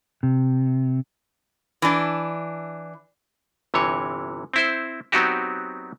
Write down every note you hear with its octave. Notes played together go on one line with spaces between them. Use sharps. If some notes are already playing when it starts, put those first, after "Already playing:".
C3
E3 D4
G1 C3 E3 C#5
C4 E4 C5
F#3 B3 C4 D#4 F#4 G4